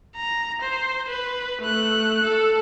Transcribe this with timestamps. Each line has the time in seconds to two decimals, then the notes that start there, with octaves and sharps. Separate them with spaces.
0.17 A#5
0.62 C5
1.09 B4
1.62 A3 F#6
2.24 A4